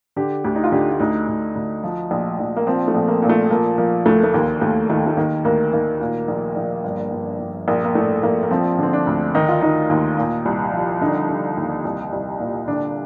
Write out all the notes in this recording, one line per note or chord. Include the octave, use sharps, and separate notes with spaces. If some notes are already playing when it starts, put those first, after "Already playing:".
D3 G4
D2 G4
D#4
F4
D3 G4
F4
D2 D#4
D2
D2
F3
A#1
A#1
A#3
F3 C4
A3
A#1
A#3
A#2
A3
F3 A#3
F3 A#3
D2 A3
A3
D#2 A#3
D#2 A3
D#3 A3
A3
D#3 A#3
D2 A#3
D#3 A#3
A#2
A#1
A#1
G1
G1
G1
A#1 A#3
A#3
A2 A3
A#1 A#3
A#3
F3 C4
D3 C4
D4
D2
D#3 D#4
F4
D#3 D#4
D#2
A#2
C2
F3
D3 D#4
D3
D#2
C2
C2
A#2
D3 D4